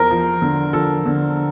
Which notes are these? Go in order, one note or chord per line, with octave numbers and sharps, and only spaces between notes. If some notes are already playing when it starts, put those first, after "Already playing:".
Already playing: E2 F3 A#4 C5
F3
D3
F3 A4
D3